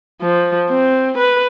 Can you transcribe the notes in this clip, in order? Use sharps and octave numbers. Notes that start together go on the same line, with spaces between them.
F3
C4
B4